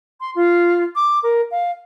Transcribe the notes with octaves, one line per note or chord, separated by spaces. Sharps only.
C6
F4
D6
A#4
F5